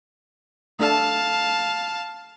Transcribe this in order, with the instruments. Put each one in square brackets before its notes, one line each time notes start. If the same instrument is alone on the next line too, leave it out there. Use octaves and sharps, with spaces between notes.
[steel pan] A3 D4 A4 [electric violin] F5 A5